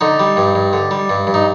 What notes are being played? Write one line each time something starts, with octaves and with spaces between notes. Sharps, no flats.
D3 D#4
G3
G2
G2
D3
G3
G2
G2
D#4